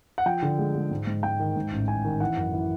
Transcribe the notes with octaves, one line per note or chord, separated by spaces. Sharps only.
F#5
F3 G5
D3
G#3
G#3
G#2
G#2
G#2 G5
D#3
G#2
A1
A1 G#5
D#3
E3 F#5
F#2
E3